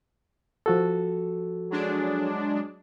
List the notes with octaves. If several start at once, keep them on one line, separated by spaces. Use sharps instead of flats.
F3 F#4 A4
F#3 G#3 D4